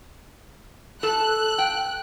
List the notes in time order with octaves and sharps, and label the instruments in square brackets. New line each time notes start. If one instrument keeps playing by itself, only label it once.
[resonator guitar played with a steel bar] A4 [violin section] F#6
[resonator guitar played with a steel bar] G5